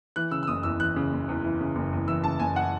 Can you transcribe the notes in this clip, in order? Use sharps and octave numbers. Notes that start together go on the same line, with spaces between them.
E3 F#6
C#3 E6
E6
F#1 D#6
E2 E6
E3 F#6
C#3
F#1
E2
E3
C#3
F#1
E2
E3 E6
C#3 A5
F#1 G#5
F#5